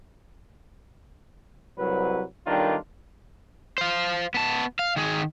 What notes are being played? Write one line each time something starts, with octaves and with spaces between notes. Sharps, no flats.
C2 F#3 B4
B1 D#3 G3 D4 F4 A#4
C5 F5
B3 A5
F5
D#3 G#4